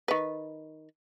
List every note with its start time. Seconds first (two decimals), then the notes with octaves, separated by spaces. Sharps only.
0.08 D#3 B4